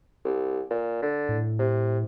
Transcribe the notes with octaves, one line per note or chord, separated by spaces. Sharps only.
C2
A#2
D3
A2
C3